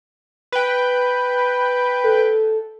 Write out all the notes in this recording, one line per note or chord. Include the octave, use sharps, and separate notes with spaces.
B4 G5
A4